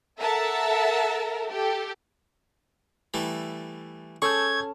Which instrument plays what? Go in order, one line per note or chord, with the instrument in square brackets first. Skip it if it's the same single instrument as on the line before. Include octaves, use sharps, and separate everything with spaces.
[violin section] A4 A#4 E5 F#5 A5
G4 A4
[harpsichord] E3 G3 A3
[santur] C#4 A4 A5 [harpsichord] G#4 [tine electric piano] C#6 E6 G6 [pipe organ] G#6